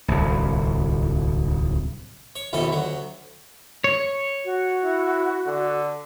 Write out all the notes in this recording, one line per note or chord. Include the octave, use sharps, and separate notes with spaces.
D1 C2
C#5
A#1 D#2 B2 A3 A4
D2 F#3
C#5
F#4
E4
D3